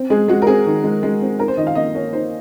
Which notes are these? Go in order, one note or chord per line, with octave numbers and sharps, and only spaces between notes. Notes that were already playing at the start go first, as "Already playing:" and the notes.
Already playing: C4
G#3 G#4
G#3 F#4
A#4
C4 G#4
D#3
G#3
G#3
C4
D#4 A#4
C5
D#3 D#5
F5
A#3 D#5
A#3 C#5
D#4 C5